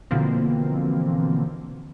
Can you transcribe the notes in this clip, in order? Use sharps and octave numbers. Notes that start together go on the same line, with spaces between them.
B2 D3 E3 F3 A#3 C4